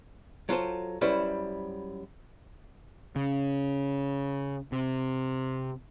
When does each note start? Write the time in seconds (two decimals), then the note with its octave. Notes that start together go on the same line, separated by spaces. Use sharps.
0.49 F#3 F4 A4 C5
1.01 F#2 G3 C#4 E4 B4 C5
3.16 C#3
4.72 C3